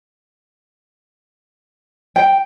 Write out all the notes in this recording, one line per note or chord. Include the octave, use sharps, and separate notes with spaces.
G5